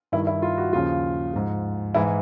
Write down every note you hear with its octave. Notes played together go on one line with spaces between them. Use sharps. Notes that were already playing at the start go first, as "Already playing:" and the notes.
G2 D#3 E4
E4
F4
F#4
D#2 C#3 F3 F4
G#2 F3
G#2 E3 E4